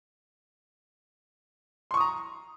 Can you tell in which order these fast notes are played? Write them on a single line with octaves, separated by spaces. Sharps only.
C6 C#6 D#6 A#5